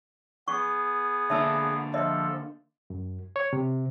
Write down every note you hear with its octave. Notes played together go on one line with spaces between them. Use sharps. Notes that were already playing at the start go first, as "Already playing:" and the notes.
B3 G#4 C#6
D3 A#3 D4 E5 A5 E6
F3 A4 D#5 E5
F#2
C#5
C3